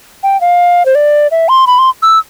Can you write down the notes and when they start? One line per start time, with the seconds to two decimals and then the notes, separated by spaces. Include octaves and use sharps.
0.23 G5
0.41 F5
0.86 C5
0.95 D5
1.31 E5
1.49 C6
1.67 B5
1.79 C6
2.03 E6